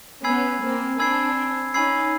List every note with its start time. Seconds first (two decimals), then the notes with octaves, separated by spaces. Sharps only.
0.24 B3 C#4 G#5 B5 E6 G#6 C7
0.62 A#3 C4
0.99 C4 D4 G#5 B5 E6 G#6 C7
1.74 C#4 D#4 G#5 B5 E6 G#6 C7